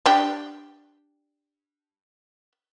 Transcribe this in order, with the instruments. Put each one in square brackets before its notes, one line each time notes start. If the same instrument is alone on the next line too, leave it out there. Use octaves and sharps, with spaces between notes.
[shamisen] D4 G4